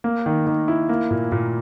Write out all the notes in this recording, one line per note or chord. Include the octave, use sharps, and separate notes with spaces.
A#3
D#3
D#3
E4
A#3
A#2
A#2